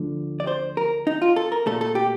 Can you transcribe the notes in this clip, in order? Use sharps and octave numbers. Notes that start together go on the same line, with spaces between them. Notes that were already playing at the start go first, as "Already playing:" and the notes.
Already playing: D2 D3 F3
D5
C5
A#4
D#4
F4
A4
A#4
A#2 A3 A4
A4
G4